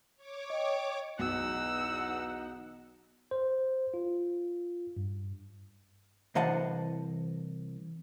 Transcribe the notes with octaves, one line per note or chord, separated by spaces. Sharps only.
C#5 D6
D#5 G5
B1 E2 B3 D#4 F#5 E6
C5
F4
G2
C2 E3 C5 D#5 F#5 A5